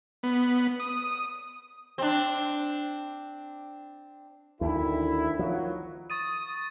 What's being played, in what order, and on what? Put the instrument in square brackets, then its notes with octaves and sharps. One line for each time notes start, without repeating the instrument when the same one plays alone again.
[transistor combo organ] B3
D#6
[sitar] C4 D4
[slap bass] D2 [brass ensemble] D#3 E4
[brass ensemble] D#3 F#3 [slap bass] F3
[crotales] C#6 A6 D#7 [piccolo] D#6